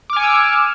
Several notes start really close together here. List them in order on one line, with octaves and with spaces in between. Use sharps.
D6 F6 G#5 C#7 E6